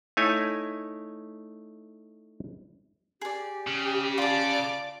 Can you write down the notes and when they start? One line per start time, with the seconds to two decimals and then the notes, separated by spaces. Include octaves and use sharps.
0.17 A3 D#4 E4 C#5 G#5
3.21 G4 G#4 D5
3.67 C#3
4.18 F4 D5 A5 D6